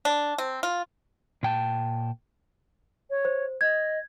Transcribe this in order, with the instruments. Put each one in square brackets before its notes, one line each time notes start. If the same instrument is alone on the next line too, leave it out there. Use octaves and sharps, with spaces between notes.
[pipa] D4
C4
F4
[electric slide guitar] A#2 G5 A5
[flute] C#5
[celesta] C5
[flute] D#5 [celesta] G#6